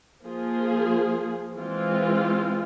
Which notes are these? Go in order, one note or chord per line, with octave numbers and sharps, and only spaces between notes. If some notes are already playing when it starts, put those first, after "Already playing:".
F3 A#3 F4 G#4
E3 G#3 C4 F4